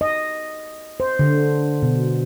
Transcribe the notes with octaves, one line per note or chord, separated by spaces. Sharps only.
D#5
C5
D3
B2